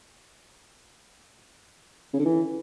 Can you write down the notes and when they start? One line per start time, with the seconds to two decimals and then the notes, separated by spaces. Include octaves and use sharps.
2.13 C#3
2.19 D3
2.25 E3